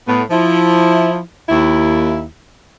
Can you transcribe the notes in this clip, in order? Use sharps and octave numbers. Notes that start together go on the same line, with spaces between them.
A2 B3
F3 E4
D#2 E4